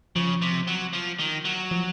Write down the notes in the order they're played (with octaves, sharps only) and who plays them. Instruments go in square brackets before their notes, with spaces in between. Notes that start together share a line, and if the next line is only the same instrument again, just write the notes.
[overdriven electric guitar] C#3 [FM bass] F3
[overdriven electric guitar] C3
F#3
F3
D#3
F#3
[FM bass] F3